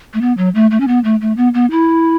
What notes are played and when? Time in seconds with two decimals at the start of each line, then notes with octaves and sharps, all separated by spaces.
0.14 A3
0.21 B3
0.38 F#3
0.55 A3
0.71 A3
0.80 C#4
0.88 B3
1.04 A3
1.21 A3
1.37 B3
1.54 B3
1.71 E4